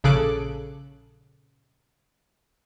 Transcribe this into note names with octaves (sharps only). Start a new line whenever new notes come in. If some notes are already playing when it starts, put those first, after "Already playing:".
A#1 C#3 G#4 A4 D6 F#6